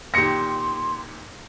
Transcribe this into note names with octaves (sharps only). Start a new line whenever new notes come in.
A#2 D#3 G4 C6 A#6 C#7